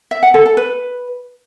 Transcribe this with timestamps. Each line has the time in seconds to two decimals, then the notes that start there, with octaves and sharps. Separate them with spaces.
0.11 E5
0.23 F#5
0.34 A4
0.46 A4
0.57 B4